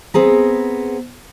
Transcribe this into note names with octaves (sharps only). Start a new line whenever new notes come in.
B3 C4 G#4 A#5